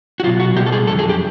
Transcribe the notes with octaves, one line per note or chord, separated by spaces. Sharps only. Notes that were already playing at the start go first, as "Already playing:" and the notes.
F#4
B2 F#3 F4
F#4
B2 G3 G4
A4
G#4
F2 D3 F#3 A4
G#4
G4